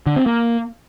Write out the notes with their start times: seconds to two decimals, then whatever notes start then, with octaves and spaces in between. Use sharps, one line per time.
0.06 D3
0.16 C4
0.26 A#3